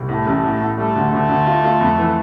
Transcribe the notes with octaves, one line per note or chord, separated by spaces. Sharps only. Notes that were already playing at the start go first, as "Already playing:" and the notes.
Already playing: C2
A2 A3
A1
A2
A2
G3 A3
D2
D2 A3
D2
F4
F4
F2
E3